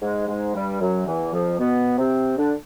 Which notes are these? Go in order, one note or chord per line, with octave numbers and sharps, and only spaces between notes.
G#2 G#3
G#2 G#3
G2 G3
F#2 F#3
E2 E3
F2 F3
B2 B3
C3 C4
D3 D4